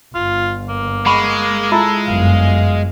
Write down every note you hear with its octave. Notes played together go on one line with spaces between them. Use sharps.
G1 F4
A#3
G#3 F#5 B5 C#6
E4 F4 A4 E5
G1 F#2 F5